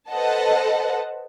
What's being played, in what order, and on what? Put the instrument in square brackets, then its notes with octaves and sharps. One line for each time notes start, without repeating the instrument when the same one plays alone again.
[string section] A4 B4 C5 D#5 F#5 A5